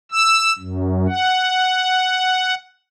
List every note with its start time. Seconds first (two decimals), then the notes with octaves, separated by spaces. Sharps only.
0.12 E6
0.59 F#2
1.08 F#5